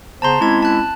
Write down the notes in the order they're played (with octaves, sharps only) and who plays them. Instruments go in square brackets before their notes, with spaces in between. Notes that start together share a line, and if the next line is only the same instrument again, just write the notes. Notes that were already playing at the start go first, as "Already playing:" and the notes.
[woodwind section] C#3 B3 C5 [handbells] A5 A#5 C6
[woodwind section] G#3 C#4 E4 [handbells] C4 G#6
[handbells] A5 F#6